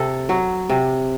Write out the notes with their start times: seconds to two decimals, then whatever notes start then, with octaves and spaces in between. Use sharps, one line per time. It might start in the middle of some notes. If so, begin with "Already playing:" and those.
Already playing: C3 A4
0.29 F#3
0.69 C3